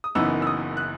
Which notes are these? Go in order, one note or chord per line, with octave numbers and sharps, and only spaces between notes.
D#6
F#1 F#2 E3 B3 D#4 E6
E6
D#6
F#6